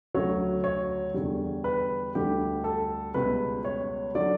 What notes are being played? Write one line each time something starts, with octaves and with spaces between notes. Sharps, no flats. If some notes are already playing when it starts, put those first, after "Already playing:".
D2 C#3 F#3 C#5
C#5
E2 D3 G3
B4
D2 D3 G3 G4
A4
C#2 B2 G3 B4
C#5
D3 F#3 D5